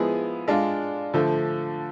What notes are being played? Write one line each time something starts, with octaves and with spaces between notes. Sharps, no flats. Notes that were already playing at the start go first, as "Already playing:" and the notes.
Already playing: F3 G#3 B3 E4 G#4
G#3 D4 F4
D3 F3 A3